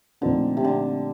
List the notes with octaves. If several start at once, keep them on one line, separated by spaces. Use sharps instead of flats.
A#2 D3 F3 A3 C4 D#4
C3
D3